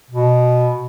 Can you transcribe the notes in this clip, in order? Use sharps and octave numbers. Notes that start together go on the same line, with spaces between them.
B2